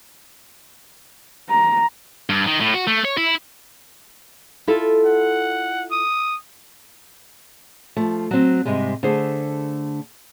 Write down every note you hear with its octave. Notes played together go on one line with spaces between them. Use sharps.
A#5
G2
D#3
A2
F#4
A3
C#5
E4
E4 F4 A4
F#5
D#6
F3 A3
F#3 C4
G#2 C3 G3 G#3
D3 A3 G#4 C5